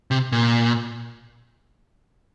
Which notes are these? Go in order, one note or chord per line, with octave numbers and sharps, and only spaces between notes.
C3
A#2